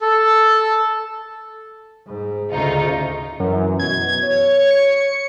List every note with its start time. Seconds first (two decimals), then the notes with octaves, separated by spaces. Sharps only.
0.01 A4
2.06 G#2
2.52 D2 C#3 D#4 F4
3.40 F#2 E3
3.79 B2 G#6
4.24 C#5
4.71 C#7